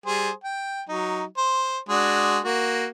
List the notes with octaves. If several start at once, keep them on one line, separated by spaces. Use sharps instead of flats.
G3 G#4 C5
G5
F#3 D#4
C5
G#3 D4 F#4
A#3 F#4